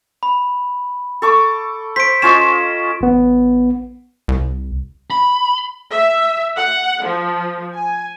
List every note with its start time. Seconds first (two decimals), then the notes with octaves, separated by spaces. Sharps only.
0.23 B5
1.22 A4 C#6 D6
1.96 C5 B6 D7
2.22 C#4 F4 D#5 E7
3.01 A1 B3
4.28 C2
5.11 B5
5.91 E5
6.55 F#5
7.04 F3
7.74 G#5